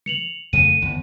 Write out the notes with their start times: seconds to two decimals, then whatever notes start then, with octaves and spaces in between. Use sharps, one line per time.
0.06 C#7 F7 F#7
0.53 F2 C#3 A3 D#7
0.81 G1 E2